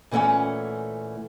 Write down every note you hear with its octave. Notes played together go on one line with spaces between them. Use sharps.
A#2 E3 A3 C#4 F#5